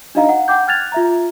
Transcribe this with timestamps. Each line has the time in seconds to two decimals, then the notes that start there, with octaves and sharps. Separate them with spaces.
0.15 D4 D#4 F#4 D#5 F5 A#5
0.29 F#5
0.48 F#5 G5 D6 G6
0.68 F6 F#6 G#6 A6 F7
0.92 F4 E5 A#5